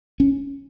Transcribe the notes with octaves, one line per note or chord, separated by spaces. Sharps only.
C#4